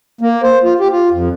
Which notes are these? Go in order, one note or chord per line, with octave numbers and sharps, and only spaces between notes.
A#3
C5
F4
G4
F4
F2